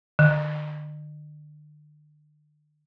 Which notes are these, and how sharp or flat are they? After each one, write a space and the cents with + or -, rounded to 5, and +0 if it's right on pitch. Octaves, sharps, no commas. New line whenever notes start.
D3 +40